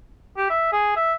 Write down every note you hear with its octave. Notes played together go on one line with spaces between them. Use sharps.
G4
E5
G#4
E5